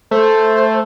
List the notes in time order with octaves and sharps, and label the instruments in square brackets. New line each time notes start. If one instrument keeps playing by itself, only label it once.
[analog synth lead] A3 [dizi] C5